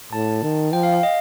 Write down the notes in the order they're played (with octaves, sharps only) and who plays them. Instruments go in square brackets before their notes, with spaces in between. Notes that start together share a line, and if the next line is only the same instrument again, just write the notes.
[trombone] A2 [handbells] A5
[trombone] D#3
[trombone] F3 [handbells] G5
[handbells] F5
F5
D#5